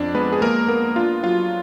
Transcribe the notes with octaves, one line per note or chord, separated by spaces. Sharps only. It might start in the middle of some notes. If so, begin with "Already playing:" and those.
Already playing: F2 D4 D5
G#3 B3 B4
G#4
G#3 A#3 A#4
A#3 B3 A#4
D4 F4
F#3 F4